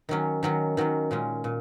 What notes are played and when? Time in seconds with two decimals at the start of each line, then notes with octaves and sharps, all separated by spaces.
0.09 D#3 F#3 C#4
0.43 D#3 F#3 C#4
0.77 D#3 F#3 C#4
1.11 A#2 G#3 C#4
1.44 A#2